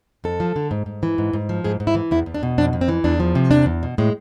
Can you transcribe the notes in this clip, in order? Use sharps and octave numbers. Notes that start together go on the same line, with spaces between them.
F2 A4
F3
D3
G#2
G#2
E3
G#2
G#2
F3
G#2 G#4
G#2
E4
E3
E2 E4
E2
D4
B2
F2 D4
F2
C4
E3
E2 D4
F3
C3
E2 D4
E2
B2
A2 G#3